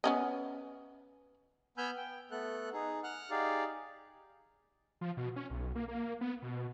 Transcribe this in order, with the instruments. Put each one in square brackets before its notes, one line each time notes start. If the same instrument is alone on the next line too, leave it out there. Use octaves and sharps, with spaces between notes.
[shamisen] B3 C#4 D#5
[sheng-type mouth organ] B3 G#5 B5 E6 F6 G6
G5
A3 B3 A4 F#6
D#4 G#4
F#5 F6 F#6
D#4 G4 G#4 D5 F5
[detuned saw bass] F3
B2
C#4
B1
A#3
A#3
B3
B2